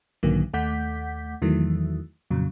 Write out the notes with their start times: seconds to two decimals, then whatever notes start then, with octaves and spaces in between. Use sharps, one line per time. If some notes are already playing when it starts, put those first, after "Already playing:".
0.23 B1 G#2 D3 D#3 F#3 A#3
0.53 D#2 A3 F#5 D6 G6 B6
1.42 E2 D#3 E3 F#3 A3
2.31 F2 A#2 C#3 F#3